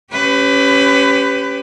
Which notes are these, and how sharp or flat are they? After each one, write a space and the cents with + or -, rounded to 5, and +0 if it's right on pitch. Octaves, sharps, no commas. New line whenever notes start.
C#4 +0 G4 +0 B4 +25